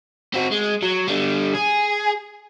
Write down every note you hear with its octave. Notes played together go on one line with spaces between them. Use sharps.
C4 F#4
G#3
F#3
D3 G3
G#4